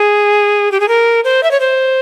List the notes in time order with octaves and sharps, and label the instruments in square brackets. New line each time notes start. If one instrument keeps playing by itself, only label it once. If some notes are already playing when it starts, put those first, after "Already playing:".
Already playing: [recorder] G#4
G4
G#4
A#4
C5
E5
C#5
C5